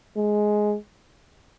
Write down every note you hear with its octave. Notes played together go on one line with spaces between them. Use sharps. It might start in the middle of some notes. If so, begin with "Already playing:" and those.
G#3